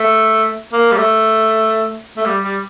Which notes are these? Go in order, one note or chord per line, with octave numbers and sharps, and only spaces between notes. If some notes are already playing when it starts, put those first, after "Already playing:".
Already playing: A3
A#3
G3
A3
A3
G3
G3